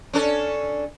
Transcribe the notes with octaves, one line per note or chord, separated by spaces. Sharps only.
C#4 D4 A4